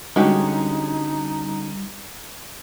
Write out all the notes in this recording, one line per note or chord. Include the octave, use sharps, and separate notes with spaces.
D3 G3 G#3 C#4 D#4 F#4 G4